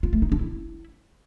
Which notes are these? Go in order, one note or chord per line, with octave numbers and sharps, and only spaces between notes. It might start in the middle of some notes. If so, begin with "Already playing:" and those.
F4
A3
D#4
D4
E4